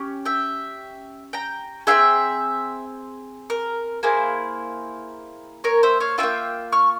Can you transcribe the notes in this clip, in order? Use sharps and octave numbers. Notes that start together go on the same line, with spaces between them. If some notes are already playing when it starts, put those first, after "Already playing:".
Already playing: C#4 G4
E5 G5
G5 A#5
C4 F4 G#4 E5 G5
A#4
A#3 E4 G#4 C5
A#4 C#5
C5 E5
C#5 F5
C#4 F4 E5 G5
A#3
C#6 F6